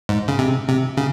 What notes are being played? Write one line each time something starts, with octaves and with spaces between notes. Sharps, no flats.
G#2
C#3
C3
C3
C#3